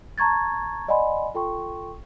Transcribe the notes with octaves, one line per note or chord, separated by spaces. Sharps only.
A5 A#5 C#6 G#6 A6
D5 D#5 F#5 G#5 B5 C6
F4 A4 G5 C6 C#6